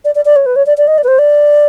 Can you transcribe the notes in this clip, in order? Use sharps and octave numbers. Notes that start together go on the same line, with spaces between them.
D5
D5
D5
C#5
B4
C#5
D5
D5
D#5
D5
B4
C5
D5